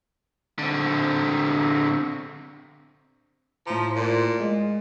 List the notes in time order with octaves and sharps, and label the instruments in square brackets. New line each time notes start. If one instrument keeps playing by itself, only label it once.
[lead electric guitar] D3 C4
[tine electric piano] A2 A#5 [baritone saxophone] F3
[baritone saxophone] A#2
[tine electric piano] G#3